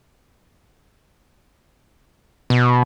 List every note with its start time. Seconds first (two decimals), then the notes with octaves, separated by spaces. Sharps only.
2.50 B2